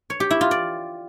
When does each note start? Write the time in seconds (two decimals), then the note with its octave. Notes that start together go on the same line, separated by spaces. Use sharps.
0.10 C#5
0.20 G4
0.31 E4
0.41 F4
0.51 D5